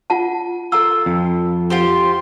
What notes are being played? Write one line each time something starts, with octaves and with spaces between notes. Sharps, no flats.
F4 F#5 A5
F4 A4 A#5 E6
F2
F4 G4 C5